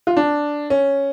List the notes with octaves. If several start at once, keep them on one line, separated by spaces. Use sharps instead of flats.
F4
D4
C#4